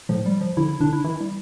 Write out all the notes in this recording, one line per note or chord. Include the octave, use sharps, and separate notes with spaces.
A2 F3
G3
F3
D3 E4
E4
D3 D4
E4
E3 E4
G3